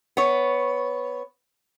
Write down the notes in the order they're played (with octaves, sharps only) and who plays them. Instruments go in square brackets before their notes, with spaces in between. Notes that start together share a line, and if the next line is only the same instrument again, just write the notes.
[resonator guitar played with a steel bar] B3 C#5